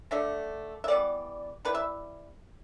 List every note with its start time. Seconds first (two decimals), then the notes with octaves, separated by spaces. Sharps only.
0.11 D3 A3 D4 E5
0.84 E5
0.88 E3 G3 B3 D5
1.65 G3 E4 B4
1.75 E5